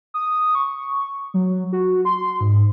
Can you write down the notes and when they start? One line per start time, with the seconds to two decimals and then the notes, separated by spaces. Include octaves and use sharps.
0.14 D#6
0.55 C#6
1.34 F#3
1.73 F#4
2.05 C6
2.41 G#2